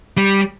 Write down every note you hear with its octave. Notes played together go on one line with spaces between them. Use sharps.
G3